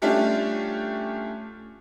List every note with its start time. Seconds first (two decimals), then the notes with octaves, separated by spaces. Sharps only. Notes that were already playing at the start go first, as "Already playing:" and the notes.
0.02 G3 A3 C#4 D4 F4 G4